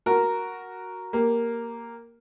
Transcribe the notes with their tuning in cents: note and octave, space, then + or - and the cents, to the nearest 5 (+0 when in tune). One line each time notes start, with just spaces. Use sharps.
F#4 +0 A#4 +0
A#3 +0 G4 +0